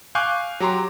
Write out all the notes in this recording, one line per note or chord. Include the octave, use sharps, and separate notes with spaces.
F5 G#5 C#6 D6 F#6 G6
F#3 G4 A#5 C6 D6